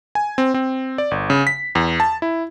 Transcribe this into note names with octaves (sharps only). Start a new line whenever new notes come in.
G#5
C4
C4
D5
G1
C#3
B6
E2
A5
E4